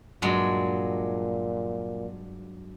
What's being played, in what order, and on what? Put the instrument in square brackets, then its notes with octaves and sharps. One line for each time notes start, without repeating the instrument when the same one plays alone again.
[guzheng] G2 F#3 G#3 [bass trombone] A#2